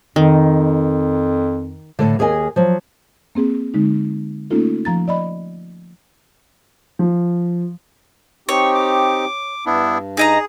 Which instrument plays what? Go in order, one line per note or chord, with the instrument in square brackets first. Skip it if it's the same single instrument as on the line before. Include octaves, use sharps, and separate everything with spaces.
[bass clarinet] F2 [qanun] D#3
[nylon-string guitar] A2 D3
D#2 G#4 A#4 D#5 G#5
F3 F#3
[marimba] A#3 C4 G#4
D3 G#3 D#4
A3 A#3 C#4 D#4 F4 A4
F3 A#5 A6
D5 D#5 B5
[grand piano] F3
[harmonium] C4 D#4 G4 [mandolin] C#5 [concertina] C#6
[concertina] D6
[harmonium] G2 [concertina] B3 D4 E4
[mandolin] D#4 D#5 A#5 [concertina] G#4